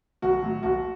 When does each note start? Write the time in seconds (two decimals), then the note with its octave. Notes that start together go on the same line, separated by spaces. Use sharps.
0.22 B1 F#4
0.43 A2 F#3
0.63 B1 F#4